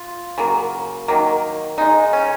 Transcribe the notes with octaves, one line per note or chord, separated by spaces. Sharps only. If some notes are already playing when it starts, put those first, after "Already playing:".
Already playing: F4
C#3 F#3 A#3
D#3 F#3 A#3
C#3 G#3 D#4
C#4